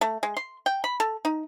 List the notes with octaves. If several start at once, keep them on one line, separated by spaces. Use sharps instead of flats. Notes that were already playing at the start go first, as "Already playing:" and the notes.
A3
G#3
C6
G5
B5
A4
D#4